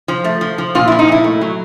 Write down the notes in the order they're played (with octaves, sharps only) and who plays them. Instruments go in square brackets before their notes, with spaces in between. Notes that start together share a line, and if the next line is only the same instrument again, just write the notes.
[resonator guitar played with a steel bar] F3
A3
F3
F3
A#2 F4
F3 E4
D#4
A#2 E4
A3
F#3